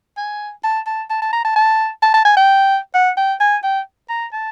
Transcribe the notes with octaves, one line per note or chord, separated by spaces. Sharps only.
G#5
A5
A5
A5
A5
A#5
A5
A5
A5
A5
G#5
G5
F#5
G5
G#5
G5
A#5
A5